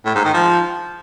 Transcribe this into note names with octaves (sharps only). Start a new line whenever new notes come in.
A2
G#2
D#3
F3